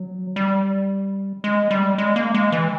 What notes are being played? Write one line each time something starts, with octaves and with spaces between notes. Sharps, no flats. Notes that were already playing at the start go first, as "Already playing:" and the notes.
Already playing: F#3
G3
G#3
G3
G#3
A#3
G#3
E3